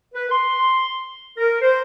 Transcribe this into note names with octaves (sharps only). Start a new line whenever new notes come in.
B4
C6
A#4
C5